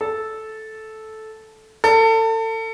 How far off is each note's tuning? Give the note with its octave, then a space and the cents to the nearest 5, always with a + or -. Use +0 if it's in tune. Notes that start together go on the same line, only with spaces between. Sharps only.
A4 -10
A4 +30